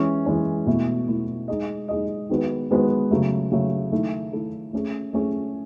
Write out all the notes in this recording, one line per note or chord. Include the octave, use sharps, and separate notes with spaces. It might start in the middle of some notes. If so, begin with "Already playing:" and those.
Already playing: E3 G#3 C#4
E3 G#3 C#4
B2 A3 E4
B2 A3 E4
G#3 D#4 G#4 D#5
G#3 D#4 G#4 D#5
D#3 G#3 B3 F#4 B4
D#3 G#3 B3 F#4 B4
C#3 F#3 A3
C#3 F#3 A3
D#3 A3 E4 A4
D#3 A3 E4 A4
A3 C#4 G#4
A3 C#4 G#4